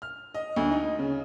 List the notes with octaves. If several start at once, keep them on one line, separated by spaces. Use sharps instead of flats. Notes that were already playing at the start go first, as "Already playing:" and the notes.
F6
D#5
D2
D#4
C#3